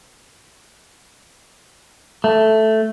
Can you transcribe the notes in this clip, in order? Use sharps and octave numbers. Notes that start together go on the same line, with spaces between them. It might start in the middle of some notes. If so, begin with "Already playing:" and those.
A3